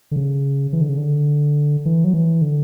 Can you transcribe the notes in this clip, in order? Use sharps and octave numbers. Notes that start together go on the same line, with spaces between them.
D3
C#3
E3
D3
C#3
D3
E3
F#3
E3
D3